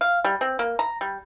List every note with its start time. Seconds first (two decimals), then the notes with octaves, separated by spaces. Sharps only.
0.01 F5
0.24 G3
0.41 C4
0.59 A#3
0.79 A#5
1.01 G3